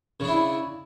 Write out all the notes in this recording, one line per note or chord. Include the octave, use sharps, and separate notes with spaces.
C#3 D4 E4